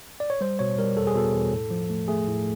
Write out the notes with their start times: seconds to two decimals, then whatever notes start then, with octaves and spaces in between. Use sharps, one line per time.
0.20 D5
0.30 C#5
0.41 G3 C5
0.59 B2 C#5
0.79 G3 A#4
0.97 E2 A4
1.07 G#4
1.15 B2 A4
1.34 E2
1.52 A2
1.70 F3
1.90 A3
2.08 A3 G#4
2.27 A2